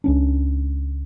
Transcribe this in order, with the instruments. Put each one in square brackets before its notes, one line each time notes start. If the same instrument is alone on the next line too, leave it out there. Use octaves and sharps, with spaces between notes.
[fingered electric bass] C#2 C#4 D4